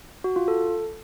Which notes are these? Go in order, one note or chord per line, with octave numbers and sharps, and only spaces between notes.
F#4
F4
A4